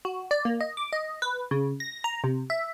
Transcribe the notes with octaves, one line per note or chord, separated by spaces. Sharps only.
F#4
D5
A#3
D#5
D6
D#5
B4
C#3
A#6
A#5
C3
E5